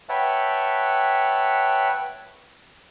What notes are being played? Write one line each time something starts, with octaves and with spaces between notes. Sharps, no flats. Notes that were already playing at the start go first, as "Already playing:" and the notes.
B4 C#5 E5 F#5 G5 A5